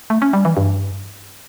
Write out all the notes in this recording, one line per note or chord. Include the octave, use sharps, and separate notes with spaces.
A3
C#4
G3
E3
G2